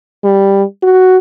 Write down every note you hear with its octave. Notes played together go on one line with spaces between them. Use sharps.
G3
F#4